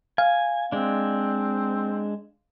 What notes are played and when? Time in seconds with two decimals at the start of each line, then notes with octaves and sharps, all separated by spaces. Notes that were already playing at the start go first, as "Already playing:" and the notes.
0.18 F5 G#5
0.72 G#3 C4 D4